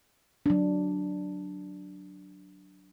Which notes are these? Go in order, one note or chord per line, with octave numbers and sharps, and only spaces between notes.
F#3 D4